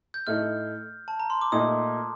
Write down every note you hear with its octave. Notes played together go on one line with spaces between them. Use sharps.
G6
A2 A3 D#4 F6
A5
A#5
C6
D6
A#2 A3 D#4 D#6